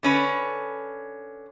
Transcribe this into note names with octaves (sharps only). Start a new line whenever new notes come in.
D3 C#4 B4